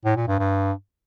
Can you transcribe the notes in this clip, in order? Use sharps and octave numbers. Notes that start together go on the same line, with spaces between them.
A2
A#2
G2
G2